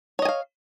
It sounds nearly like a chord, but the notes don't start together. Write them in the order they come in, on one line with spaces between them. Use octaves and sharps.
C#5 D#5 G#5 F5